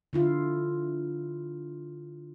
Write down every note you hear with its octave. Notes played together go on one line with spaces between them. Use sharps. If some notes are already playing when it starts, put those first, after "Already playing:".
D3 E4 F4